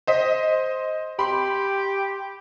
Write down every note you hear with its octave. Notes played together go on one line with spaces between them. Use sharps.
C5 D#5 B6
G4 B5 C6